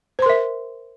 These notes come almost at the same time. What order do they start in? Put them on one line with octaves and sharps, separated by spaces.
C5 C6 A#4 E5